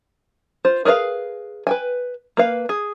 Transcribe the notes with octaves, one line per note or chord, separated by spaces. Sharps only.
F4 C5
G#4 A#4 B4 D#5 F5
B4 G5 G#5
A#3 B4 F5
G#4